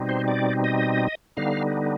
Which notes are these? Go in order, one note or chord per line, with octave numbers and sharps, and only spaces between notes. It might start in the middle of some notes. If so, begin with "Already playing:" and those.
Already playing: B2 G3 C4 D#4
C5
D5
D#5
D3 G3 B3 D#4 F5